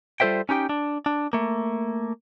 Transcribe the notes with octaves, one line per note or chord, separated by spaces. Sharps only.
G3 F4 A4 C5 E5 G5
C#4 D#4 G4 G5
D4
D4
A3 A#3